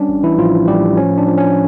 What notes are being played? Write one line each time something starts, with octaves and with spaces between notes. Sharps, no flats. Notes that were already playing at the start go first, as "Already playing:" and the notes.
Already playing: G3 C#4 D4
A1
E3 E4
A2 F3 F4
A2 G3 G4
F3 C#4
D4
F3
C#4